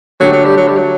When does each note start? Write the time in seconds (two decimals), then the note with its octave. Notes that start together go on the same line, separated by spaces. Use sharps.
0.20 D3 F#3 A3 D4 G4
0.32 F#3
0.45 G3
0.57 F#3
0.68 G3
0.77 F#3